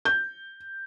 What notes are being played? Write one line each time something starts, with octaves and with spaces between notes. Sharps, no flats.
G6